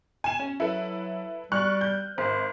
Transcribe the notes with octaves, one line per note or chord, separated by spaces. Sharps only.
G#5 E7
C#4
F#3 E4 A4 B4
G3 C#6 F6 F#6
G6
G#1 C5